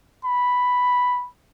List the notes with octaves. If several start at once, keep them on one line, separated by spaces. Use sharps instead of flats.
B5